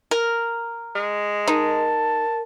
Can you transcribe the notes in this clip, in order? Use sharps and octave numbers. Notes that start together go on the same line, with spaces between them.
A#4
G#3
D#4 A#4 A5